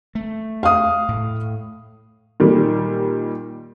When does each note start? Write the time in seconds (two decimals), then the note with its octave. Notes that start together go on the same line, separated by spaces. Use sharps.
0.15 A3
0.63 F5 D#6
1.08 A2
2.40 A#2 D#3 G3